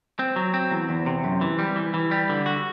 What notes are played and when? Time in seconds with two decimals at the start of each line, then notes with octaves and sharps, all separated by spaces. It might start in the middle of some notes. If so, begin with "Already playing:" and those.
0.19 C4
0.36 F#3
0.54 C4
0.71 E2
0.89 E2
1.06 C3
1.24 F#2
1.41 E3
1.59 G3
1.76 E3
1.94 E3
2.11 G3
2.29 D3
2.46 F#4